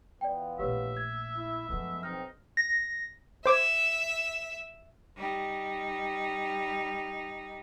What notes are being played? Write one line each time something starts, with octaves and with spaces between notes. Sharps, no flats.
E3 B3 F4 D5 G5
A#1 A3 G4 B4 C#5 E5
G#6
E4
F#2 F3 G#3 A3 B3
B1 C4 D#4 F6
A#6
C5 E5 D6 G#6
G3 D#4